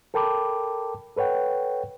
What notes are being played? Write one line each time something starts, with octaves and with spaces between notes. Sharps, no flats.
A4 A#4 G5 A5 B5 D6
A4 B4 C#5 F#5 G5